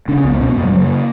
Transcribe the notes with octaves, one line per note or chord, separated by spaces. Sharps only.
C#3 D4
C#4
C#2 B3
A#3
B2 C#4
B3
F#2 A#3
G3
C#3 F#3
A#3